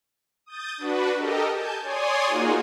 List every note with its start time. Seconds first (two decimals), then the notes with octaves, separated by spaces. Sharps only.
0.46 D#6 G6 A6
0.77 D4 F#4 B4
1.17 G4 A4 A#4 D#5
1.52 G#5 A5 G6
1.82 C#5 D5 G#5 C6 D#6
2.26 A#3 D#4 F4 F#4 G#4